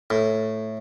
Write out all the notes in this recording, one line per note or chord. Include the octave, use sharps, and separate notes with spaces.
A2